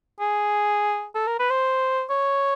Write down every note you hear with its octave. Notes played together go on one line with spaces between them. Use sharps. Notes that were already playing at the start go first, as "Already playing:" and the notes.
G#4
A4
A#4
B4
C5
C#5